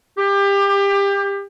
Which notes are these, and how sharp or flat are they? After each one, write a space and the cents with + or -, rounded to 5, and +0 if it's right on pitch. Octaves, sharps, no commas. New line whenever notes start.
G4 +25